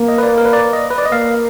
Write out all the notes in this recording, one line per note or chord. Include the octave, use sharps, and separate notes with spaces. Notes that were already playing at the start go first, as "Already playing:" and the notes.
Already playing: A#3
D#5
B4
D5
A#4
B4
D5
D#5
B4
D5
D#5
A#3 F5